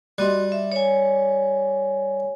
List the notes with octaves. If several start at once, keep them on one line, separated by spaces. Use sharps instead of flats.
G3 F#4 D#5 C6
E5
C#5 G#5